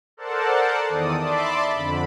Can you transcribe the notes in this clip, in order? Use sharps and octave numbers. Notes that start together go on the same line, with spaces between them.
A4 A#4 C5 D5 F#5 A5
E2 D#3 D5 D#6
D5 E5 A5 B5 C6 D6
F2 D3 B5